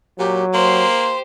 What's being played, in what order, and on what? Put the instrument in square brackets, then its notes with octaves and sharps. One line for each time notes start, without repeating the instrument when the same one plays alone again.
[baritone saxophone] A#2 [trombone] F#3 [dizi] G4
[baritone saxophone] A#3 [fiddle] G4 C5 [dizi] C6